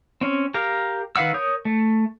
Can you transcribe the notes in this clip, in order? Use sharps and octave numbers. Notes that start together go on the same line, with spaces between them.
C4 C#4
G4 A#4 F5
D#3 B4 F5 F#5 E6
A#4 C#5 D#6 G6
A3